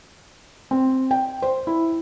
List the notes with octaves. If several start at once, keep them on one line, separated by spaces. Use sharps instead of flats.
C4
G5
C5
E4